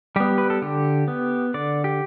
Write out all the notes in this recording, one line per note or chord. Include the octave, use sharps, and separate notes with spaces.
G3 B3 G4
B4
A4
D3 G4
B3
D3 D5
G4